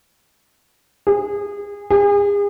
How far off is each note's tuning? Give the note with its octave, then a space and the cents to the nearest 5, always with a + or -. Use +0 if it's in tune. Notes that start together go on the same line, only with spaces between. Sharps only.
G#4 -30
G#4 -40